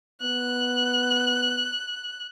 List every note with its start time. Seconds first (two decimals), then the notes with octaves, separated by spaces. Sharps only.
0.22 B3 F#6